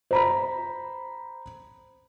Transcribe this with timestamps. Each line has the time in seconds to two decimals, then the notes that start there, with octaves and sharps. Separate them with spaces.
0.11 C5 A#5 B5